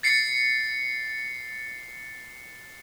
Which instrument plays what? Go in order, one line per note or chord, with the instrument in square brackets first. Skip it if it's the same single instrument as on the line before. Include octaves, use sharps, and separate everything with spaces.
[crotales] A6 C7 C#7